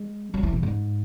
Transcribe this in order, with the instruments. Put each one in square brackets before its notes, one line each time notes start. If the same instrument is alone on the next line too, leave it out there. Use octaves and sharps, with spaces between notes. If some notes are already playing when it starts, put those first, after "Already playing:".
Already playing: [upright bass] G#3
F#3
E3
B2
G#2